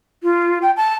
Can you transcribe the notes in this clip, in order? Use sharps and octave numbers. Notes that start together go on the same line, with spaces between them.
F4
G5
A5